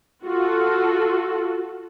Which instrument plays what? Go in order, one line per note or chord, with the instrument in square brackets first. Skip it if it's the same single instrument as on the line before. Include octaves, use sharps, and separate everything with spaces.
[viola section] F4 F#4 A4